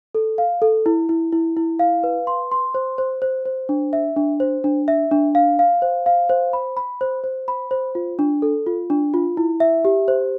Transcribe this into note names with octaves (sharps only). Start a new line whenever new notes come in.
A4
F5
A4
E4
E4
E4
E4
F5
B4
C6
C6
C5
C5
C5
C5
D4
E5
D4
C5
D4
E5
D4
F5
F5
C5
F5
C5
B5
B5
C5
C5
B5
C5
F4
D4
A4
F4
D4
F4
E4
E5
G4
C5